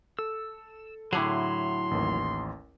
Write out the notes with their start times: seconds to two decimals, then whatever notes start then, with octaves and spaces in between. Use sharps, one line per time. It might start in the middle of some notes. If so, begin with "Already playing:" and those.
0.19 A4 E6
1.13 A2 D3 F#3 E4 G#4 C6
1.91 A1 D#2